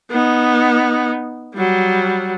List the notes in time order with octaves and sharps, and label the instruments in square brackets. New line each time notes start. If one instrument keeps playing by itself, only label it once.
[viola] B3 D#4
F#3 G3